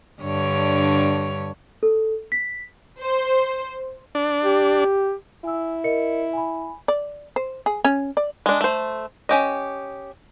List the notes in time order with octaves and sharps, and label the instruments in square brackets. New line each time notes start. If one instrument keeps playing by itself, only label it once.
[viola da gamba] G2 D3 C#5
[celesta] A4
B6
[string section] C5
[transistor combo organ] D4
[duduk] G4
[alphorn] E4 [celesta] G#5 E6
[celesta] A#4 D#5 C#7
G#5 B5
[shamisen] D5
C5
G#4
C#4
D5
[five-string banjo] G#3 D4
A3 C5
C#4 G4 D#5